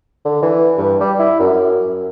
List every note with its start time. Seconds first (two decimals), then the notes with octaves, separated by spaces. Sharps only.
0.25 D3
0.42 E3
0.78 G2
1.00 G3
1.19 E4
1.39 F#2